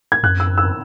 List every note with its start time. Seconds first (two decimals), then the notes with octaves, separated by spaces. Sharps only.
0.12 G#6
0.23 F#2 F#6
0.40 E6
0.58 E6